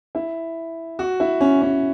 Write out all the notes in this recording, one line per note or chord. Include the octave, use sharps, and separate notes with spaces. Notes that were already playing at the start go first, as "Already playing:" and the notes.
E4
F#4
E4
C#4
C#4